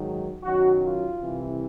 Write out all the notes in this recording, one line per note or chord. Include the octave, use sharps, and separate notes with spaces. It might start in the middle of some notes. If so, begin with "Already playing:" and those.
Already playing: G#2 D#3 F#3
F#2 D#3 F#3 F#4
F4
C2 C3 E3